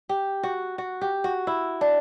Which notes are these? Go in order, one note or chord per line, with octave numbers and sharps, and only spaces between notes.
G4
F#4
F#4
G4
F#4
E4
D4